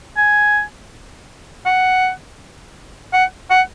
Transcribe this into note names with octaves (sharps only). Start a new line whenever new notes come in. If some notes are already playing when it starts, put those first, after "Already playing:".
G#5
F#5
F#5
F#5